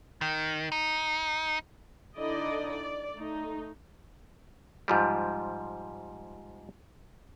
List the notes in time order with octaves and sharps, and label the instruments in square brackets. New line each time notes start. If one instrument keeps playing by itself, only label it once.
[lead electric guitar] D#3
D#4
[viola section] D3 D#4 E4 D5 D#5
D5
A3 D#4
[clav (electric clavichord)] G#2 F3 G3